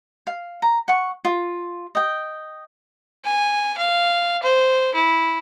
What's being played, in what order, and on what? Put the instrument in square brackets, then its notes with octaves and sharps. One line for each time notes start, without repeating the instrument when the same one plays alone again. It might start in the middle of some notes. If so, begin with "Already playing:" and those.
[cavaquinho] F5
A#5
F#5 C#6
F4
D#5 G5
[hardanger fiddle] G#5
F5
C5
E4